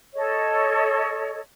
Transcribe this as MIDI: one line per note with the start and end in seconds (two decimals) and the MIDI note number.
0.14 1.40 69
0.14 1.40 73
0.14 1.40 75